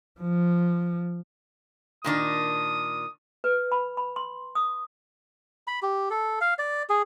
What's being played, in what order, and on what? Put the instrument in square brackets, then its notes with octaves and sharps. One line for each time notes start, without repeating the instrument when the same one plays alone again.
[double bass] F3
[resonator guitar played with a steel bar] A#2 D#3 D4 [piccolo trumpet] D#6
[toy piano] B4
B5
B5
C6
D#6
[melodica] B5
G4
A4
F5
D5
G#4